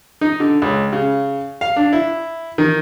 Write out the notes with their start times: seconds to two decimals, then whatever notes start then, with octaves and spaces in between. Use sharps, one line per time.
0.21 D#4
0.40 D3
0.62 C#2
0.93 C#3
1.61 F5
1.76 D4
1.93 E4
2.58 D#3